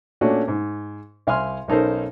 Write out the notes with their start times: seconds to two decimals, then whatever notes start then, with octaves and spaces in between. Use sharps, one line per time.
0.21 A#2 A3 C#4 D4 F#4
0.48 G#2
1.27 C2 F5 G#5 C6 F6
1.68 B1 C#4 D#4 A4 A#4 C5